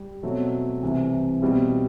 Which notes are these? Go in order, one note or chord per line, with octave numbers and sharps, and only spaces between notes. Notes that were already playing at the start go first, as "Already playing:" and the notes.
Already playing: G3
B2 F#3 A3 C4
C2 C3 E3
B2 G3 C4 E4